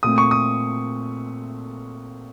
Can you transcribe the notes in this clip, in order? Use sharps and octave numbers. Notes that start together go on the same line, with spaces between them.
A#2 A3 C4 D#6
C#6
D#6